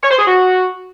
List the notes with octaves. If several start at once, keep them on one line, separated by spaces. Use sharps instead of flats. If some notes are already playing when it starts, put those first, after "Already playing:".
C#5
C5
G#4
F#4